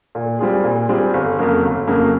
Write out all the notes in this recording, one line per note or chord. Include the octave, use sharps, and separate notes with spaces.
A#2
G3 C4 F4 G#4
A#2
G3 C4 F4 G#4
G1
F2 C#3 F#3 A#3
G1
F2 C#3 F#3 A#3